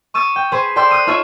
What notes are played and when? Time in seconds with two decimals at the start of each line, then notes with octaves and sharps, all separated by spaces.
0.14 C#6 D#6 E6 A6
0.36 G5
0.52 G#4 B4 C5
0.76 A4 D5 G5 C6 E6
0.91 D#6 E6 F#6
1.07 D#4 F4 A4 C#5 E5